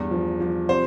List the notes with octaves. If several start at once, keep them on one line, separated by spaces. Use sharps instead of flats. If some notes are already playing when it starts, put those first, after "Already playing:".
Already playing: E2 G2
F3
F3
C3 C5